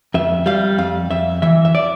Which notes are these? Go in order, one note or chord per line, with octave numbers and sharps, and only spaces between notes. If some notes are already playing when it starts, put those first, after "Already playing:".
F2 E5
G3 F5
F2 F5
F2 E5
E3 E5
E5
D5